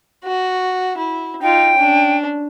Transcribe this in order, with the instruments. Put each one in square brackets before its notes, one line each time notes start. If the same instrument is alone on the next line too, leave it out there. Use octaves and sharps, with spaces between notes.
[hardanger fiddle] F#4
E4
[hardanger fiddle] D#4 F4 [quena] G5
[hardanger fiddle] C#4 D4